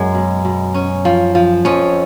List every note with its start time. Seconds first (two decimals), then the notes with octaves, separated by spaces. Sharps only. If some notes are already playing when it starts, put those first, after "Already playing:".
Already playing: F#2 G#3
0.15 B2
0.45 B2
0.74 C#4
1.05 F3
1.35 F3
1.65 F2 C#4